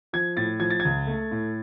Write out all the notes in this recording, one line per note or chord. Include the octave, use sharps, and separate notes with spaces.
F3 G#6
A2 A6
F3 G#6
A6
C#2 G#6
A3
A2